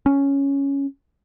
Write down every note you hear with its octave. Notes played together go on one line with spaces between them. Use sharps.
C#4